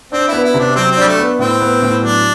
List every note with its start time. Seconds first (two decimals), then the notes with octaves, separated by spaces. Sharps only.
0.12 C4 D4
0.28 B3 E4
0.44 E4
0.54 C3 D4
0.75 F#3 C4
0.91 C4
0.96 G3 D4
1.07 A3
1.19 B3
1.39 A2 C4
1.61 B3
1.82 A2
2.03 F#3 D4